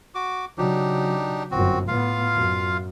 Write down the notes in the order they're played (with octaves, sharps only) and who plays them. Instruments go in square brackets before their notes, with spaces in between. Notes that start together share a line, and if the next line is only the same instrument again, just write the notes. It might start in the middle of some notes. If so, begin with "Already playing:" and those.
[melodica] F#4 D6
[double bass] C#3 F#3 [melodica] D4 D#4 G4
[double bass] G1 F#2 [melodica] C4 F#4
[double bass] A2 B3 [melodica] F4 F5
[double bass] F#2